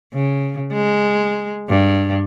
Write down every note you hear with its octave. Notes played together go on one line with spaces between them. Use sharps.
C#3
G#3
G2